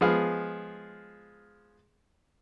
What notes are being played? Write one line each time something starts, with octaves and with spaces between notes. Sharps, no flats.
F3 G#3 B3 G#4 F5